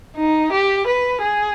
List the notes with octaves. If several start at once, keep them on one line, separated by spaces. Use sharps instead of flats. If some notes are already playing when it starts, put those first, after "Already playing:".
D#4
G4
B4
G#4